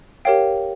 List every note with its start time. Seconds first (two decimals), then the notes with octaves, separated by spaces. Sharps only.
0.25 G4 A#4 C#5 F5 G5